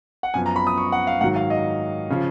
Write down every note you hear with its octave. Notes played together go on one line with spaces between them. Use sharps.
F#5
F#2 F3 B3 G#5
A#5
B5
D#6
C#6
F#5
F5
G#2 D#3 F#3 F#5
F5
D#5
C#3 F3